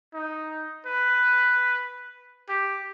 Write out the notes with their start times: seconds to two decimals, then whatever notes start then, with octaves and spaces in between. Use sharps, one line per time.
0.14 D#4
0.86 B4
2.49 G4